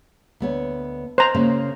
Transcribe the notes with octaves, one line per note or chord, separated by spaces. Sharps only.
D2 B3 C#5
C5 A#5
C#3 A#3 C#4